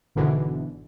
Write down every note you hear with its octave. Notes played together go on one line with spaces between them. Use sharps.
G#1 G#2 B2 D3 E3